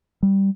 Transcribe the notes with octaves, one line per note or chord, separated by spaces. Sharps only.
G3